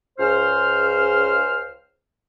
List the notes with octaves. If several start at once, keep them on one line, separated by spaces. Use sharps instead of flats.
C#2 C5 F6